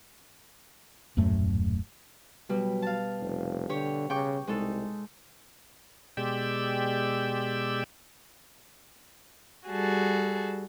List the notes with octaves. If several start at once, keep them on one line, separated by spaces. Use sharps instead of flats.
D#1 F#2 A2 A3
B2 F#3 G3
F5 A5
F1
D3 G4 C#5
C#3 G5 C#6 D6
C2 G#3 D#4 A4
B2 G#3 G4 D5 G5 E6
G3 F#4 G#4 A4